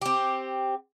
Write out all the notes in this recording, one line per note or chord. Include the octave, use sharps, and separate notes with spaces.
C4 G4